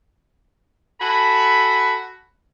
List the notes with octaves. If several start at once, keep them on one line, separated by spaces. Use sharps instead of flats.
F#4 A4 G#5 B5